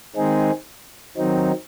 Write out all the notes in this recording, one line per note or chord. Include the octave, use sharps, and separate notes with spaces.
D#3 G#3 C4 D#4 G#4
D#3 F#3 C4 D#4